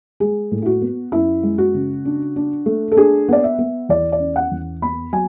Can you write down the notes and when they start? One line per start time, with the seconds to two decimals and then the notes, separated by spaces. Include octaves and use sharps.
0.20 G#3 G#4
0.51 A2
0.62 E4
0.66 F#4
0.82 B3
1.12 F#2 E4
1.43 G#3
1.58 F#4
1.74 C#3
2.05 D4
2.36 D4
2.66 A3
2.92 A4
2.97 D4 G#4
3.29 B3 D5
3.44 E5
3.58 B3
3.89 E2 D5
4.12 D5
4.20 C#4
4.36 F#5
4.51 E2
4.82 B3 B5
5.12 F#3 G#5